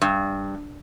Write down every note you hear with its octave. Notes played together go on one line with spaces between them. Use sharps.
G2